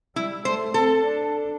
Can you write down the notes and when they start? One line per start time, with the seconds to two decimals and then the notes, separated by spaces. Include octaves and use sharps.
0.16 G3 E4
0.45 A3 C5
0.73 C4 A4
1.03 D4